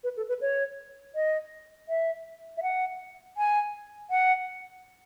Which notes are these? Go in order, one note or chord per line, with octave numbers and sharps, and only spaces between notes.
B4
A4
B4
C#5
D#5
E5
E5
F#5
G#5
F#5